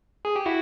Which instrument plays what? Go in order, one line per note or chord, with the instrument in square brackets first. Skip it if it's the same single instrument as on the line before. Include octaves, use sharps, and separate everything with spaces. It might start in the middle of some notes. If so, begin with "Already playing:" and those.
[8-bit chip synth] G#4
G4
E4 F#4